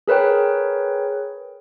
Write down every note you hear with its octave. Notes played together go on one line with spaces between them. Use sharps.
G#4 A#4 B4 C#5 G5